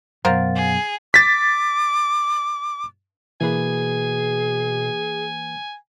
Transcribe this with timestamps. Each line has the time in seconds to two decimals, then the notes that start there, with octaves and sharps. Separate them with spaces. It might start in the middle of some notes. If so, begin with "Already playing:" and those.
0.25 F#2 B2 A#4 C5 F5 F#5 A6
0.56 G#4
1.14 D6 A6 B6
3.41 B2 E3 A#3 G#4 B4 G#5